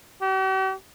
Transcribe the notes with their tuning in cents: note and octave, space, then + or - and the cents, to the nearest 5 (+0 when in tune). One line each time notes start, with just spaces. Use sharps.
G4 -45